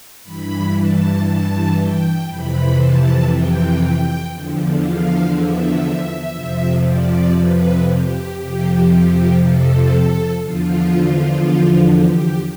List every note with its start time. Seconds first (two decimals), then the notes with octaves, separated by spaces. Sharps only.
0.23 G2 E3 B5
0.74 A5
1.25 A5
1.76 G5
2.26 F2 C3 E3 B5
2.78 A5
3.29 G5
3.80 G5
4.31 E2 D3 F3
4.82 F5
5.33 E5
6.34 F2 C3 F3
6.85 D5
7.36 B4
7.87 G4
8.38 F2 C3 F3 G4
8.88 G4
9.39 A4
10.41 E2 D3 F3 F4
11.93 G4